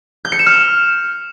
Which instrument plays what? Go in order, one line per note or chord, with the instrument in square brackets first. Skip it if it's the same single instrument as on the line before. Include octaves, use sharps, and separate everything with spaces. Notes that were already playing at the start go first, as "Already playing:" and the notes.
[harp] G6
C#7
E7
F6